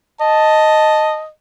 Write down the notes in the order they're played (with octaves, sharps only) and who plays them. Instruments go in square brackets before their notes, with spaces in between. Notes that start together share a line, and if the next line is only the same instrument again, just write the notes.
[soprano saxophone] D#5 [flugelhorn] A5